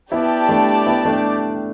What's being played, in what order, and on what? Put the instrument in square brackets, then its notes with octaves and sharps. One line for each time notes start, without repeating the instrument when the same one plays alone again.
[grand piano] B3 E4 [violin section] G4 D5 A5
[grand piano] A3 D4
B3 E4
A3 D4